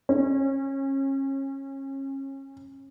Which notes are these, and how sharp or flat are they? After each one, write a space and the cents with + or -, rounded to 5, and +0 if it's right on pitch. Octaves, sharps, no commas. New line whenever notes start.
C#4 -30